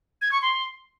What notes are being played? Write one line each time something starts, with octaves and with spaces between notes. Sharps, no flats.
G#6
C#6
C6